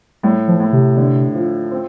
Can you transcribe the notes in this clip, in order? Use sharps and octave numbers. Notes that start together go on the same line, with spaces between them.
A2 G3
F3
A2
C3
D3
F3
C4